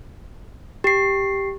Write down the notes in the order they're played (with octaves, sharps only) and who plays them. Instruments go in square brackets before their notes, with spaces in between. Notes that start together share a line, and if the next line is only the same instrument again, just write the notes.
[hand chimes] G4 C7